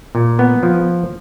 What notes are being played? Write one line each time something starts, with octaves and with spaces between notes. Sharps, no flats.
A#2
B3
F3